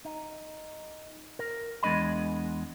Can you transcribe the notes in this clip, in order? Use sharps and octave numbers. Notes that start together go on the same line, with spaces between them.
D#4
A#4
E2 G#3 D4 D#5 B5